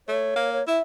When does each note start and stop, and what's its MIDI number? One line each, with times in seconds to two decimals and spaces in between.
0.08 0.32 57
0.08 0.50 73
0.36 0.61 58
0.53 0.66 73
0.68 0.79 64
0.68 0.82 76